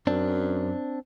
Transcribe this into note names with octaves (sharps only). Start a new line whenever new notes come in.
F#2 C4 D4